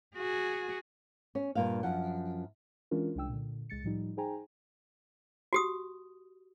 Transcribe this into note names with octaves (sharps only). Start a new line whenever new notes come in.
F#4 G#4
C#4
G2 A#2 F5
F#2 F3 F#5
E3 G#3 C#4 D4 F4 A#4
C2 G#3 D4 G5 E6
A#2 D3
C2 G#3 A6 C#7
A2 F3 G3 D#4
D#4 G#4 C5 G5 G#5 A#5
F#4 G4 D#6